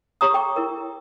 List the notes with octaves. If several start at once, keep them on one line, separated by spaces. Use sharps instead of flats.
G4 C#5 A#5 C#6 D#6
A4 G5 C#6 D6
E4 A#4